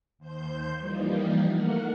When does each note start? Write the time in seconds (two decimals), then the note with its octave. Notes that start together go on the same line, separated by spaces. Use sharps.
0.18 D#2 C5 G6
0.78 E3 F3 G3 A#3 D#4
1.47 A3 A#3 A#4 F#5